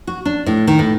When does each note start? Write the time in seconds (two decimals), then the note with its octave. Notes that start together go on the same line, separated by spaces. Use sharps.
0.07 F#4
0.25 D4
0.46 A2
0.67 D#3
0.79 A2